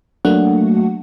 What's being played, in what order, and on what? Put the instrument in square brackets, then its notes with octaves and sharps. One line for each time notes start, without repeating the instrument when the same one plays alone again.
[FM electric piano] F#3 A3 A#3 D4 F#4 F#5